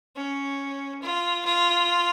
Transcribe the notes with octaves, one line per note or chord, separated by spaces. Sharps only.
C#4
F4
F4